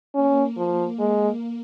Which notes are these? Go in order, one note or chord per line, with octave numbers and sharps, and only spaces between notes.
A#3 C#4
F3
G#3